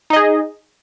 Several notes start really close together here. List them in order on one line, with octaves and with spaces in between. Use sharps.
D#4 D#5 G#4